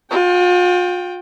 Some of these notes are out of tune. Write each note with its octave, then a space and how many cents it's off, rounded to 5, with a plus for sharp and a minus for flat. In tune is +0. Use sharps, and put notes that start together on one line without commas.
F4 +40 G5 +0